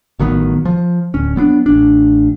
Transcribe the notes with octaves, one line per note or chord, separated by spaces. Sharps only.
A1 D#3 F#3 B3
F3
D1 C#4
F#3 B3 C4 D4
A1 D4